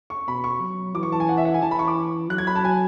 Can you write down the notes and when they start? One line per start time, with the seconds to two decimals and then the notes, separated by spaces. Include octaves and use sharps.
0.10 C#6
0.27 B2 B5
0.44 C#6
0.61 F#3
0.95 E3 D6
1.03 C#6
1.12 A5
1.20 G#5
1.29 F#5
1.37 E5
1.45 F#5
1.54 G#5
1.62 E3 A5
1.71 B5
1.79 C#6
1.87 D6
2.30 F#3 F#6
2.38 G#6
2.47 B5
2.55 A5
2.65 G#5